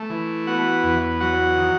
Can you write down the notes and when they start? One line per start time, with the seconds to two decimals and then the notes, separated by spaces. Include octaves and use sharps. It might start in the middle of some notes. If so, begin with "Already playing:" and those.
Already playing: A3
0.10 E3
0.47 B3 F#4 F#5
0.83 E2
1.20 F#3 F#4 F#5
1.57 D#3